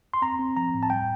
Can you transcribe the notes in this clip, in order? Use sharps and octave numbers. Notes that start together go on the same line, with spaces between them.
C6
C4 A#5
C4
F3 A#5
A2
A5
G3 G5